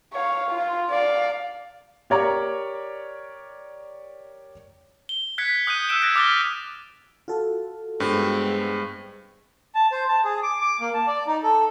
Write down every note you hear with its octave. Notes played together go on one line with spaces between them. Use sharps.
C#5 F5
F4
D5 F5
G4 A#4 C#5 D5 A#5 C#6
G7
F#6 G#6 B6 C#7
D#6 F#6 G6 D#7
E6 F#6 C#7 D7 E7
F#6 G#6 A#6 B6 D7
D6 F6 F#6 A6 B6 G7
F4 F#4 A4
G2 G#3 B3 C4
A5
C5
A5
G#4
D6
D6
A#3
A5
D5
D#4
A4